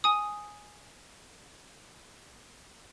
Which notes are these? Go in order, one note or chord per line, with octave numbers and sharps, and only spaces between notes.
G#5 D#6